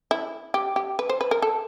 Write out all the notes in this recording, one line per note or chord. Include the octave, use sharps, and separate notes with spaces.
E4
G4
G4
B4
C5
B4
A#4
A4